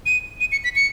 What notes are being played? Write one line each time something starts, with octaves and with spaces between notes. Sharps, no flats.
D#7
D#7
C#7
B6
C#7